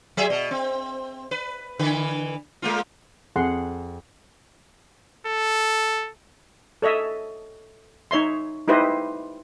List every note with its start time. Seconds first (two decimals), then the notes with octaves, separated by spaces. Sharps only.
0.17 F#3 G#4 E5
0.30 B2 D#5
0.51 C4
1.31 B4
1.79 D3 E3 B4
2.62 G#3 A#3 F4
3.36 F2 G#4 F#5 C6
5.27 A4
6.82 A4 C#5 D#5 E5
8.11 D#4 C#5 E5 C6
8.68 D#4 E4 G4 B4 C5 D#5